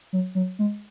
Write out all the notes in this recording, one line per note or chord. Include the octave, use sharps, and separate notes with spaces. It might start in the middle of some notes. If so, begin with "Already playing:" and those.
F#3
F#3
G#3